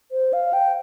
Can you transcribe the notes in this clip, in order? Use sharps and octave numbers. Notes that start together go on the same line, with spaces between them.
C5
F5
G5